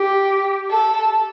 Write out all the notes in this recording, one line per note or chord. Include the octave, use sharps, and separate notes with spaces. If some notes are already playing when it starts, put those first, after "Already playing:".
Already playing: G4
A4